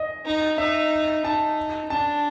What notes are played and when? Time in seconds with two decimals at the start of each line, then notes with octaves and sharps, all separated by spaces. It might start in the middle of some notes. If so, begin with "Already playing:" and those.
Already playing: D#5
0.26 D#4
0.58 D#4 E5
1.25 D#4 A5
1.90 D4 A5